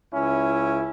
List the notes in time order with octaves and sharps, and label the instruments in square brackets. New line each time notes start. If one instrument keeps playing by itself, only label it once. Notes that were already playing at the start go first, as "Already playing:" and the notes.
[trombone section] C#2 C#4 E4